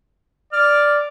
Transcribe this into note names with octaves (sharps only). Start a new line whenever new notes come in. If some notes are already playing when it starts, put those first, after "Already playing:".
D5 F6